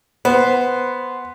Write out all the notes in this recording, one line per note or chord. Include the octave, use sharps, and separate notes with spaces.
B3 C5